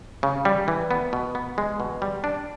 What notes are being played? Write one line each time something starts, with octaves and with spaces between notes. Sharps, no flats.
C#3
G3
E3
B3
B2
B3
G#3
B2
G3
D4